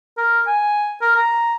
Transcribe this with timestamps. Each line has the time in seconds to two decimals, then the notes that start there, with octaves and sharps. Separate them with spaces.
0.18 A#4
0.47 G#5
1.01 A#4
1.16 A#5